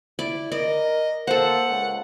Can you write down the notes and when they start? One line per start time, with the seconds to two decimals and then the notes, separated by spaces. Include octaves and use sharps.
0.19 E4 D5
0.52 A#4 D5 D#5
1.27 A#3 A4 C5 F#5
1.69 C#2